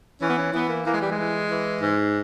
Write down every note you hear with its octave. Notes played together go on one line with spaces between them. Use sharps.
E3 C#4
B3
C#4
E3 B3
A#3
E3 A#3
G#3
G3
G#3
E3
E3
G#2